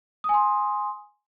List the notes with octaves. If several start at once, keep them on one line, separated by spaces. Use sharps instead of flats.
G#5 C6 D#6